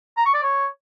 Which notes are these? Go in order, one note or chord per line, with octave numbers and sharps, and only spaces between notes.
A#5
C#6
D5
C#5